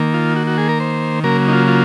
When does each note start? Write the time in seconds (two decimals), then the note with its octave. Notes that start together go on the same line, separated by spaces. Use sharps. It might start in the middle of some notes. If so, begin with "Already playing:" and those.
Already playing: D#3 A#3
0.14 F4
0.36 F#4
0.47 F#4
0.58 G#4
0.69 A#4
0.80 C5
1.24 C#3 F#3 A#3 A#4
1.48 D#4
1.53 F4
1.68 F4